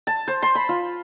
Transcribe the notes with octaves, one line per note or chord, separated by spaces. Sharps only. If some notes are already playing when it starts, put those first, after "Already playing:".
A5
C5
C6
B5
F4